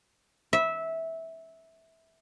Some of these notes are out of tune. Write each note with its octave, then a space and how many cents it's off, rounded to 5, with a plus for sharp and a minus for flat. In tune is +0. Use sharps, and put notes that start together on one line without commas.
E5 -15